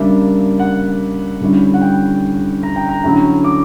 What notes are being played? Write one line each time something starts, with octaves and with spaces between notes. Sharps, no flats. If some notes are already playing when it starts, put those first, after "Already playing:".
Already playing: C#3 G3 A#3 D4 E5
F#5
D3 G3 C#4 E4
F#5
G5
A#5
G5
A#5
D3 F#3 C#4 E4
D6